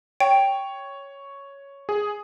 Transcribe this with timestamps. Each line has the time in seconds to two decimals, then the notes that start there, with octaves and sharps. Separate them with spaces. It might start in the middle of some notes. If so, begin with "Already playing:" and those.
0.20 C#5 G5
1.89 G#4